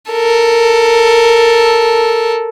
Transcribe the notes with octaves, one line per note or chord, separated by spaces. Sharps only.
A4 A#4